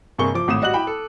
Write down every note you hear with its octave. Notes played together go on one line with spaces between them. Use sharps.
G2 C3 A#3 G#4 C#6 G7
F3 D6
G#1 A2 D#6 E7
G3 F#4 D#5 F#6 F#7
E4 G5 B5
A4